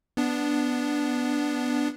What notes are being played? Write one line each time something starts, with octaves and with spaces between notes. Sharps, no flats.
B3 D4